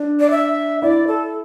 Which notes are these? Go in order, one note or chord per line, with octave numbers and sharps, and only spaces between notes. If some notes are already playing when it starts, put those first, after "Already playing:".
Already playing: D4
D5
E5
E4 D5
A4